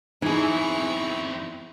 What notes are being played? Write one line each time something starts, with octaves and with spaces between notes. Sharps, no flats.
E2 E3 C4 D#4 E4 G#4 C#6